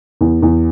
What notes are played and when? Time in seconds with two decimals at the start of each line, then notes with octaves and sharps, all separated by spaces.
0.21 E2
0.42 E2